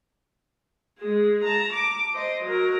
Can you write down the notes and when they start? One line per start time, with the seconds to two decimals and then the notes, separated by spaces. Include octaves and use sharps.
0.99 G#3 G#4
1.44 A5 A#5
1.73 D6
2.14 C5 D#5
2.44 F#3 A#4